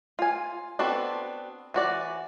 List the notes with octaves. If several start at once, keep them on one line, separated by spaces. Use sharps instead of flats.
F4 G#5
B3 C4 D4 F#4 A4
E3 F#4 D5